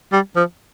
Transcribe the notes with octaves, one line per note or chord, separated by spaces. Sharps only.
G3
F3